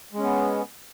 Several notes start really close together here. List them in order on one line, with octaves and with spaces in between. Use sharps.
G#3 C#4 B3